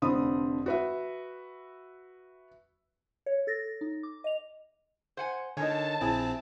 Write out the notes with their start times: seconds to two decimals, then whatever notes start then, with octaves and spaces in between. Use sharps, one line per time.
0.02 F1 D3 C4 B5 D#6
0.66 F#4 B4 E5
3.26 C#5
3.47 A4 A6 A#6
3.81 D#4
4.03 D6
4.24 D#5 F7
5.17 C5 F#5 G#5
5.57 D3 D#4 A#4 C#5 G#5 A5
6.01 A#1 C4 E4 G#4 G5